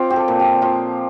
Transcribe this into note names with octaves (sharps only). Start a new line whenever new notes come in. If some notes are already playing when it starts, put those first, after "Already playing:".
Already playing: C4 F4 C5 D5
G4
A4
A#2
G4
F3 F4